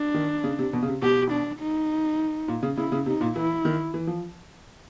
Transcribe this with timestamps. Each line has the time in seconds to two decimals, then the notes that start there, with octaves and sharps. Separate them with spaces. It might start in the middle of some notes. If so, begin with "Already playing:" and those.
Already playing: D4
0.14 D#3
0.44 C#3
0.59 C3
0.73 B2
0.82 C#3
0.88 C3
1.02 B2 G4
1.32 D4
1.60 D#4
2.48 A#2
2.63 C#3
2.77 C#3 E4
2.92 C#3
3.06 C3 D#4
3.21 A#2
3.36 E3 E4
3.65 D#3
3.94 E3
4.07 F3